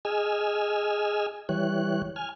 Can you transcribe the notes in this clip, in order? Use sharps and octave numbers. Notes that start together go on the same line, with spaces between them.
G#4 D#5 G#5 E6 F6
E3 G3 C#5 F#6
G#5 F6